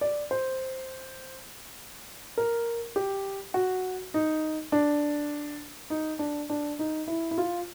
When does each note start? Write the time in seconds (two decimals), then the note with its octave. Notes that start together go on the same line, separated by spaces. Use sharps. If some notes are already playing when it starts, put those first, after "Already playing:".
0.01 D5
0.31 C5
2.38 A#4
2.96 G4
3.54 F#4
4.14 D#4
4.72 D4
5.90 D#4
6.19 D4
6.50 D4
6.79 D#4
7.07 E4
7.31 E4
7.38 F4